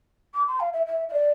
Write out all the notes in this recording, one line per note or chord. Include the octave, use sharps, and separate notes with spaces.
D6
C6
F5
E5
E5
E5
D5